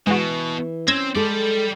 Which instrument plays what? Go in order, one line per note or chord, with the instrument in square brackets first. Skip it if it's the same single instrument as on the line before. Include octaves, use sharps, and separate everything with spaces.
[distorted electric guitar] B2 [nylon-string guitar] E3 [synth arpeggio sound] G#3 F#4
[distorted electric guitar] C4 [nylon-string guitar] C#4 [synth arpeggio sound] E6 G#6 A#6
[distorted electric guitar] G3 D5 [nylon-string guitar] G#3 A4